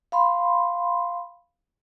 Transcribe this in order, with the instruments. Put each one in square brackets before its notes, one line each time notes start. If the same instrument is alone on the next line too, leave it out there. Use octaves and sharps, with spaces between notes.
[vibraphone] F5 B5 C6